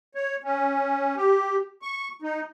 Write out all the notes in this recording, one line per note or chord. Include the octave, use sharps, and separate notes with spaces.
C#5
C#4
G4
C#6
D#4